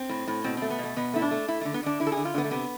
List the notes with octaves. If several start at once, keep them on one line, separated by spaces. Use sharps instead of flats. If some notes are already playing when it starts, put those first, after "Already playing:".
Already playing: C4
A2
A2
B2 C4
A3 C4
B3
B2 A3
B2 B3
A3 E4
D4
A3
A3 E4
D3 A3
B3
D3 D4
D3 E4
A4
G#4
D3
F4
D3 B3
A3
C3 B3